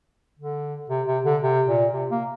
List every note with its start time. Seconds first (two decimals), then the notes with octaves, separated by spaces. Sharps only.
0.39 D3
0.90 C3
1.07 C3
1.25 D3
1.42 C3
1.68 A#2
1.93 C3
2.11 A#3